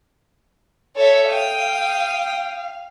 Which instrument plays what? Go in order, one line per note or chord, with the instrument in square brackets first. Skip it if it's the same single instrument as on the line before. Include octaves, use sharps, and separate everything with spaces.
[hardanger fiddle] A4 E5 [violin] C#5
[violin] F5 [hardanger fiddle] G5 D#6